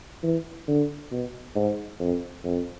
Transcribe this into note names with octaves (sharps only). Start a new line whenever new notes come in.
E3
D3
B2
G#2
F2
F2